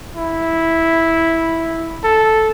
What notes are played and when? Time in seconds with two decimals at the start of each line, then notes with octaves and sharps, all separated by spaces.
0.16 E4
2.04 A4